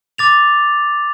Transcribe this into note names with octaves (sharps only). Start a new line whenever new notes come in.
D6 A6 F7